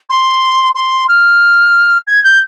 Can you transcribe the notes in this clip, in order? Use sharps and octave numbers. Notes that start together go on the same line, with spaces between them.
C6
C6
F6
G#6
G6